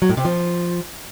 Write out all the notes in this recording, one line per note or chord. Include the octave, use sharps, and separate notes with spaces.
F#3
A2
C3
F3